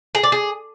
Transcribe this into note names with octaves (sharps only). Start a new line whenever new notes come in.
G#4
D5
G#4